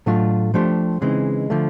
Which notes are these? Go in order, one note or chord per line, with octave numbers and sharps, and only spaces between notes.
A2 F#3 A3 D4 F4
F3 A3 D4 G4 C5
C#3 E3 G#3 C4 D#4
D3 F3 A3